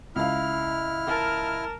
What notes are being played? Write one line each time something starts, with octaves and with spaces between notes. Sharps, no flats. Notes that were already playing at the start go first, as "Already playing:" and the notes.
C#2 E4 F5 F6
A#4 A5